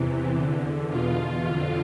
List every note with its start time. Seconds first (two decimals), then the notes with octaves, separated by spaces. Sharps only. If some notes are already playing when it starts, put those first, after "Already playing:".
Already playing: E2 C3 E3
0.35 E2 D3
0.89 E2 B2 F4
1.44 F2 D3 F4